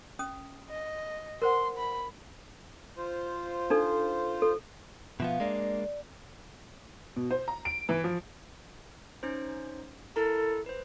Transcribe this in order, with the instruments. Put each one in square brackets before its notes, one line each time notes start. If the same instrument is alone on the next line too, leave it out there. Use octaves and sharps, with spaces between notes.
[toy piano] C#4 D#6
[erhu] D#5
[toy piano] A#4 C5 F#5 [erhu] C6
[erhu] B5
[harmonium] F4 C5
[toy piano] D4 D#4 A4
A4
[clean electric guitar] B2 F3 B3 [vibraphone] E5 F5
[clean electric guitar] G#3 A#3 D4 [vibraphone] D5
[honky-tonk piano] B2
C5
A#5
D7
E3
F3
[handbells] C#4 D#4 C5
[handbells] E4 A#4 A#5 [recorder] A4
[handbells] B4 C5